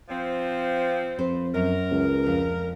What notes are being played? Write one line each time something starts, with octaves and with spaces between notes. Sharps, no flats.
F3 C4
F2 B4 C5
F#2 A#4
C#2
F2